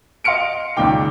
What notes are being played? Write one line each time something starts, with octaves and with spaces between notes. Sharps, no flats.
D#5 F5 C6 F6 C#7 D7
C#2 A#2 D#3 G5 D6